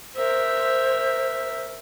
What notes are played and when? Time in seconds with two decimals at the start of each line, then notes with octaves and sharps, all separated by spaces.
0.16 A#4 C5 E5